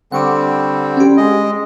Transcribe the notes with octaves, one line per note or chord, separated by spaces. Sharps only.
D3 G3 C4 F#5 C#6 D6
C#4 G4
G#3 D#5